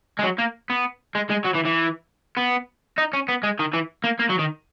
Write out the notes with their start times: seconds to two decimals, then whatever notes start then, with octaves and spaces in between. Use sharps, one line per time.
0.19 G#3
0.23 F#3
0.38 A#3
0.70 B3
1.15 G#3
1.30 G#3
1.45 F#3
1.55 E3
1.66 E3
2.37 B3
2.98 D#4
3.13 C#4
3.28 B3
3.43 G#3
3.59 D#3
3.73 E3
4.04 A#3
4.20 A#3
4.30 F#3
4.40 D#3